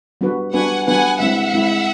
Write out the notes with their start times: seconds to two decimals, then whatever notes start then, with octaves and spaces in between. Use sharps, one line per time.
0.21 G3 B3 D4 F#4 B4
0.53 G3 B3 D4 F#4 B4 F#5 G#5
0.87 G3 B3 D4 F#4 B4 F#5 G#5
1.20 G#3 C4 E4 E5 F#5
1.54 G#3 C4 E4